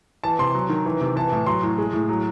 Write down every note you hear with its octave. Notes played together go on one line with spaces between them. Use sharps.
E3 A5
C3 C6
F#3
D#3
E3
C3
E3 A5
A2
F#3 C6
A2
G#3
A2
F#3